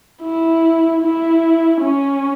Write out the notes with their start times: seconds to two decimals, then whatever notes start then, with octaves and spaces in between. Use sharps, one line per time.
0.23 E4
1.03 E4
1.81 C#4